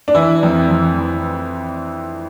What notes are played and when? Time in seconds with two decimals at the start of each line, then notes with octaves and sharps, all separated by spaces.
0.08 D4
0.15 E3 E4
0.43 F2
0.71 F2
0.98 E3